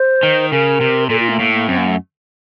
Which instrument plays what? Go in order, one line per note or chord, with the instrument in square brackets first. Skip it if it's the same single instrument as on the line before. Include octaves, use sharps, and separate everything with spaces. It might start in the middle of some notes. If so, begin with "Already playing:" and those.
Already playing: [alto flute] C5
[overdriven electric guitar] D#3
[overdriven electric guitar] C#3 [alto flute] A#4
[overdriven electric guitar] C3
[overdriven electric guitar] A#2 [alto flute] A4
[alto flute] F4
A3
[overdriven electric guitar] A2 [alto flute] A#3
[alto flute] A#3
[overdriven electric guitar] F#2 [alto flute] C4
[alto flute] A#3
A3